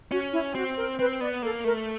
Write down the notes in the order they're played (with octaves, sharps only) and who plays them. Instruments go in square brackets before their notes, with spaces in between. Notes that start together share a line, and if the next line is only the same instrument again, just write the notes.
[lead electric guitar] C#4 [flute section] F#4
[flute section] E4
[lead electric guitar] C4 [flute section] F#4
[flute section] A#4
[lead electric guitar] C4 [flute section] B4
[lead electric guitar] B3 [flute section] D5
[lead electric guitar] A#3 [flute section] A4
[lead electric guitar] A3 [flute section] A#4